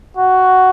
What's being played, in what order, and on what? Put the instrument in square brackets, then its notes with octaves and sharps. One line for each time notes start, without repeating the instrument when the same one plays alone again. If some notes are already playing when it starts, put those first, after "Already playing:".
[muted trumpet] F#4